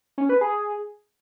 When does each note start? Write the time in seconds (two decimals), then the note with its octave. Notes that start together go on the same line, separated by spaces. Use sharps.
0.18 C#4
0.29 B4
0.41 G#4